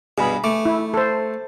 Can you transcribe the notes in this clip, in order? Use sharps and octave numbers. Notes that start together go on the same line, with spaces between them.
G2 B2 G#4 B5
A3 D6
E4
A4 C5